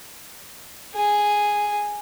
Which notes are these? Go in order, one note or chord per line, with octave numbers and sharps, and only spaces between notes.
G#4